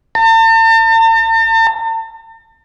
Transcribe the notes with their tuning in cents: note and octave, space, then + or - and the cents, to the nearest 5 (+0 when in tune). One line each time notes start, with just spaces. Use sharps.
A5 +45